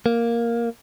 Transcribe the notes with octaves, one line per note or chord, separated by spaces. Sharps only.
A#3